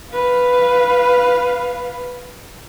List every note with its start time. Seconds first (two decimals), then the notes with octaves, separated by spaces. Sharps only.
0.13 B4 F5